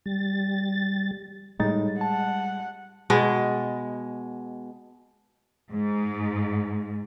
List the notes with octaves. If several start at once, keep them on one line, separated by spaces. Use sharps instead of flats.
G3 A6
A2 G3 G#3 D#4 A6
F#5 A5
B2 G#3
G#2